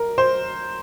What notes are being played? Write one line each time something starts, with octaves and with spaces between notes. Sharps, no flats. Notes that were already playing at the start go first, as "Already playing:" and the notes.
Already playing: A#4
C5